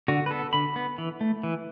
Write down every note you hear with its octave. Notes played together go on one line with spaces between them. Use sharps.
D3 F#4
B4
B3 A4
D3 B5
B3
E3
A3
E3